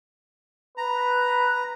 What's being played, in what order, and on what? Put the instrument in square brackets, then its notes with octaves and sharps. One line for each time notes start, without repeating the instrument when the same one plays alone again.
[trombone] B4 [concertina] A#5